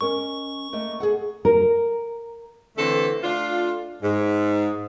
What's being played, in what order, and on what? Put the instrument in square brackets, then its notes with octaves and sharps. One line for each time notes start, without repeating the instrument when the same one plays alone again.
[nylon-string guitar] C#4 A#4 D#5 [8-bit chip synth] C#6
[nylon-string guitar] A3 A#3 D#5
G#4 A4 F#5
A#4
[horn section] D3 E3 A3 C4 A4
A3 D4 F4
G#2